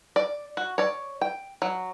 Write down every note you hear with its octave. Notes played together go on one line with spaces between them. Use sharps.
D5
F#4
C#5 D5
G5
F#3